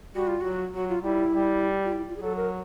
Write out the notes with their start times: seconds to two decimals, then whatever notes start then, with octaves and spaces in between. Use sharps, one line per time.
0.15 G3 F#4
0.27 F4
0.41 F#3 F#4
0.74 F#3 F#4
0.89 F4
1.03 G3 E4
1.33 G3
1.85 F4
1.92 E4
2.08 F4
2.16 G#4
2.22 F#3 A4
2.37 A#4